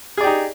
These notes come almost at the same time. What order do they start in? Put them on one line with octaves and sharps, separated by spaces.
G#4 D5 G4 D#4